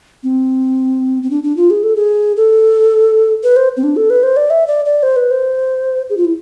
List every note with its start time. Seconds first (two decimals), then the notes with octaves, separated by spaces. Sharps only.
0.23 C4
1.23 C4
1.30 D4
1.43 D4
1.57 F4
1.70 G#4
1.83 A4
1.96 G#4
2.37 A4
3.43 B4
3.56 C5
3.77 C4
3.83 D4
3.96 A4
4.10 B4
4.23 C5
4.37 D5
4.50 E5
4.67 D5
4.85 D5
5.03 C5
5.16 B4
5.31 C5
6.10 G#4
6.17 F4
6.25 E4